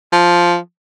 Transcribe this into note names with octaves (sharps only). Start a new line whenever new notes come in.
F3